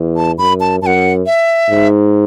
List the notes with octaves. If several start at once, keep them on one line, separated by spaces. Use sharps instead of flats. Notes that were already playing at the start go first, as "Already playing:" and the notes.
Already playing: E2
A5
F#2 B5
A5
F#2 F#5 A5
E5
G#2